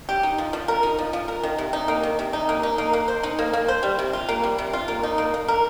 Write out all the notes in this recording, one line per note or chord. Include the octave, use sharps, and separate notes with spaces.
G4
D#4
F3
F3
A#4
D#4
F3
F3
A#4
D#3
C3
D#4
A#3
D#3
C3
D#4
A#3
D#4
A#3
A#3
C5
D#4
A#3
A#3
C5
G3
C3
F4
A#3
G3
C3
F4
A#3
D#4
A#3
A#3
A#4